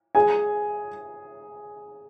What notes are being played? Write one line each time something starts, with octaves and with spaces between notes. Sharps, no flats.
G#4 G#5